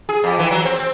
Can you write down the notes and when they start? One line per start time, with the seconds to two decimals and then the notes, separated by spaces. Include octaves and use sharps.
0.09 G#4
0.24 F2
0.39 E3
0.51 F#3
0.65 C4
0.79 C4